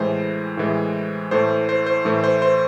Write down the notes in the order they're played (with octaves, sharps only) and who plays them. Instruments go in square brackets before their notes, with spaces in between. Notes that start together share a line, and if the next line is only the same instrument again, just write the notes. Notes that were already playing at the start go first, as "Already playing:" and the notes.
Already playing: [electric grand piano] A2 E3 G#3 C5
A2 E3 G#3
A2 E3 A3 C5
C5
C5
A2 E3 A3
C5
C5